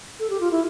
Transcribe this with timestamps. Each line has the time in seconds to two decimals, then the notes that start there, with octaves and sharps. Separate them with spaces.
0.20 A4
0.30 G4
0.41 F4
0.51 E4